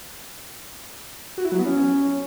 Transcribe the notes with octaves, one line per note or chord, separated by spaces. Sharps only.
F#4
E4
F#3
B3
C#4